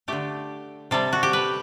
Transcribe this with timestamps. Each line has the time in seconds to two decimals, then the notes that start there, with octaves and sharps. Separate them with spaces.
0.08 D3 A3 G4
0.91 C3 G3 A4
1.13 F#4
1.23 G4
1.33 B4